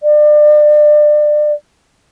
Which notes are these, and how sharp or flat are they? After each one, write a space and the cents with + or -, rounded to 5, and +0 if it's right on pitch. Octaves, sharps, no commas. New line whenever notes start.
D5 +30